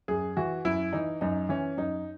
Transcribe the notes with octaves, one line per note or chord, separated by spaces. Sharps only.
F#2 G#4
E3 F#4
F#2 E4
E3 D#4
F#2 D#4
E3 C#4
F#2 D#4